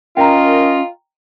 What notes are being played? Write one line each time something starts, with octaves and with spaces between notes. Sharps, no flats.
C#4 F4 A#4 D#5 G5 A#5